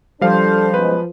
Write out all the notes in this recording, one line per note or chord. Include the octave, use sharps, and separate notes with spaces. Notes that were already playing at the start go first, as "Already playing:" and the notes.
F3 G3 D4 A4 C5 F5
F#2 B2 G#3 B4